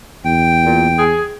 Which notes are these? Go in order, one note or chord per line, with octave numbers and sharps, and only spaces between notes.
E2 G5
A#2
G#4